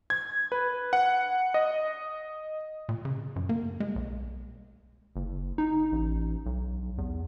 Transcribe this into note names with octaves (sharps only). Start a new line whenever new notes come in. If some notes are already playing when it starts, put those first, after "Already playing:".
G#6
B4
F#5
D#5
A#2
C#3
F#2
A#3
G#3
B1
F#1
D#4
A1
B1
E2